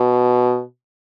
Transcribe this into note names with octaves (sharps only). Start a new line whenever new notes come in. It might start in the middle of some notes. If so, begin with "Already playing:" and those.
Already playing: B2